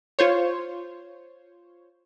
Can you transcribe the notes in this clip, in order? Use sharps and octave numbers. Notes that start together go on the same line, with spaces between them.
F4 C5 C#5